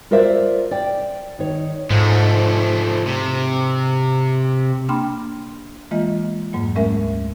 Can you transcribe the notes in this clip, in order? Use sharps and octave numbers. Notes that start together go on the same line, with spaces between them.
F4 A#4 C5 D5 E5
D5 G5
D#3 C#5
G#2 F3 A3
C3
A#3 D4 G5 B5 C6 F6
E3 G#3 A#3 F4 D#5
F2 G#2 F#3 A#3
D2 G#3 A3 C#4 A#4 E5